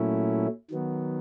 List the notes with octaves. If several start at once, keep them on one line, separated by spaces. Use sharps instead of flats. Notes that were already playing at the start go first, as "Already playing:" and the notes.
Already playing: A#2 F#3 A3 C#4 E4
D#3 F#3 B3